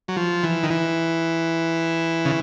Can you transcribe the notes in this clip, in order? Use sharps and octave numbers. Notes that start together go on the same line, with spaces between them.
F#3
F3
E3
D#3
E3
C#3